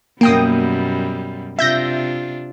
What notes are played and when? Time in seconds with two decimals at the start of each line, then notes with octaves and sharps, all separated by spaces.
0.21 F#2 B2 G3 A#3 G5 D#6
1.59 C3 D4 F4 E5 G6 A#6